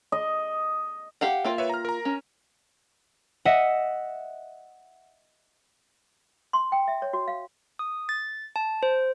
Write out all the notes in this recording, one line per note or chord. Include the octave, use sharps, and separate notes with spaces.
D#5
G4 F5 F#5
A#3 F4 E5 G5
B4 C#5 E5
A#5 F6
A#4 A#5
C#4
D#5 E5 F#5
C6
G5
E5
C#5
F#4
F5
D#6
A6
A5
C5